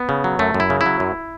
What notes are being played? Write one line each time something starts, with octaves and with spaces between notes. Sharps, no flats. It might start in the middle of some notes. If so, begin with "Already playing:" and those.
Already playing: B3
C#3
F#3
F#2 A3
F#2
E4
C#3
E4
F#3
F#2